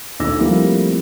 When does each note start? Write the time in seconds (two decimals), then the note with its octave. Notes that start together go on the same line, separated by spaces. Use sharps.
0.20 D2 D#4 D6 E6 A#6
0.39 F3 G3 A3 A#3 C4 E4